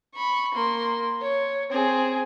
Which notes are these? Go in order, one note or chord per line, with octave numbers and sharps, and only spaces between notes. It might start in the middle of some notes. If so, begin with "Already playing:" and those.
B5 C#6
A#3 C6
C#5
C4 G#4